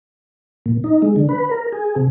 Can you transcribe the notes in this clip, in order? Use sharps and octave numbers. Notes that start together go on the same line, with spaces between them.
A#2
D#4
G#3
D3
B4
A#4
G#4
C3